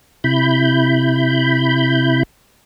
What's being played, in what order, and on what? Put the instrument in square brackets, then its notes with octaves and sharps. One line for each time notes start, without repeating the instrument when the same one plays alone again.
[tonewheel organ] C3 E4 B5 G6